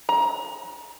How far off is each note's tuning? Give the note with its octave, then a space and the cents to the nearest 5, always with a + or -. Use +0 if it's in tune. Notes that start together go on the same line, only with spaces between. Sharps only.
A#5 +25